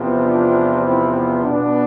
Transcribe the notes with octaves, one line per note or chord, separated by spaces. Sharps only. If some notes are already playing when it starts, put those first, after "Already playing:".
Already playing: E2 C3 F3 B3
D4 F4
C4 E4
B2 B3 D4